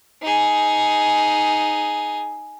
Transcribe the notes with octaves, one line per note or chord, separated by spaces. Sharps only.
D#4 G#4